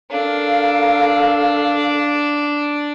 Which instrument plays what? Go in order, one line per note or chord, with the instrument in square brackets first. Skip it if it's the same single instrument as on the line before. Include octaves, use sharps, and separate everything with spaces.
[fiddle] D4 [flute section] A4 A#4 F5